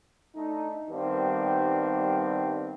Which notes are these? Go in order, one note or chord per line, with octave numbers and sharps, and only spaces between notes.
A3 D4 D#4
G2 D#3 G3 B3 C4